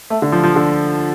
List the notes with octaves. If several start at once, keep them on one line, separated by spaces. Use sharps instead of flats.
A3
D3
F3
F3
D3